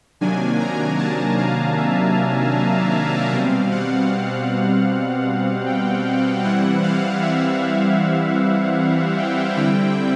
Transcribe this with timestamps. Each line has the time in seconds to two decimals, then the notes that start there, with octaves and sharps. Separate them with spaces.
0.21 C3 D#3 F#3 A#3 D4 G#5
0.60 A#5
0.98 A5
1.38 F5
1.77 E5
3.32 B2 G3 C4 F5
3.71 F#5
5.66 G5
6.44 E3 G3 C4 E4 F#5
6.83 F5
7.22 E5
9.18 G5
9.57 D3 G3 C4 E4 G5